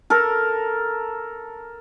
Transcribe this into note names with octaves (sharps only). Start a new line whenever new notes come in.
A4 A#4